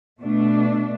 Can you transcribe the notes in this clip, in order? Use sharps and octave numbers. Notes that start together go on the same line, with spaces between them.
B2 A3 D4